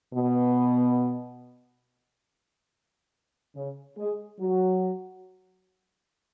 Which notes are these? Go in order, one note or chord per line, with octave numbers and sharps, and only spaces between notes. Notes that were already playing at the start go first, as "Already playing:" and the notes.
B2 B3
C#3 C#4
G#3 G#4
F#3 F#4